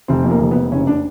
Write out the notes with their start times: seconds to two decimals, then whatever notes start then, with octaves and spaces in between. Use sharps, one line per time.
0.08 F1 C4
0.25 F2
0.30 A#3
0.40 F1
0.51 F1 B3
0.72 F#1 C#4
0.87 D4